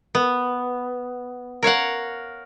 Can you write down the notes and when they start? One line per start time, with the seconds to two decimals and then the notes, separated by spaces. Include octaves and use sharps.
0.15 B3
1.63 A#4 C#5 F5 F#5